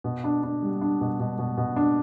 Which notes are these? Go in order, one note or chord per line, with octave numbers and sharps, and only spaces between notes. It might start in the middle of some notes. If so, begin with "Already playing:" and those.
B2
D4
D4
G3
D4
B2
B2
B2
B2
D4